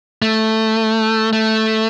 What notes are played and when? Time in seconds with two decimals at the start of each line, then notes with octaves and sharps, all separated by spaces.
0.22 A3
1.33 A3